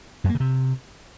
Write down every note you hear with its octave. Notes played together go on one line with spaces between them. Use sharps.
F#2
A#3
C#3
C3